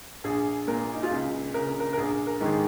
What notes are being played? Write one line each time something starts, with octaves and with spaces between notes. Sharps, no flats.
A#1 G#4
A#2 A#4
D#4
F4
C#2 G#4
C#3 A#4
A#4
A#4
A#1 G#4
A#4
G#2 D#3 G#4